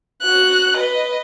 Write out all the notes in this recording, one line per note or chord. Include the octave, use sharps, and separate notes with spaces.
F#4 F#6
B4 D#5